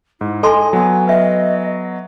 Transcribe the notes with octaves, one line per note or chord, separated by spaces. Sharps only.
G#2 E4
A4 D#5 G#5 A5 C6
F#3 B3 G#5
B4 D#5 E5